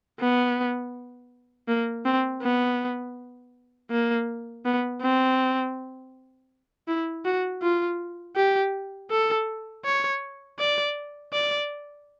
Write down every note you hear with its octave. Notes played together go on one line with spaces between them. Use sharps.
B3
A#3
C4
B3
A#3
B3
C4
E4
F#4
F4
G4
A4
C#5
D5
D5